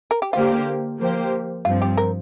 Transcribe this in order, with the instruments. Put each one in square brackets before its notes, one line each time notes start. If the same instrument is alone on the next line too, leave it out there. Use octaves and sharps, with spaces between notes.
[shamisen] A#4
G4
[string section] D3 A#3 G4 C5 [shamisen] F4
[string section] F3 A#3 G4 C5
[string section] G2 F3 C4 [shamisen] F4
[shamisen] G4
A#4